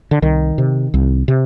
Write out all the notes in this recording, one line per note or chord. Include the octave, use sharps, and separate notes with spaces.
D3
C2 D#3
C3
C2
C3